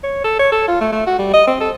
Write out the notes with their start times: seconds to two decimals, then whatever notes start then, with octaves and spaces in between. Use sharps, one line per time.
0.03 C#5
0.24 A4
0.39 C#5
0.52 A4
0.68 F4
0.81 A3
0.92 A3
1.07 F#4
1.19 G3
1.34 D#5
1.47 C4
1.60 A4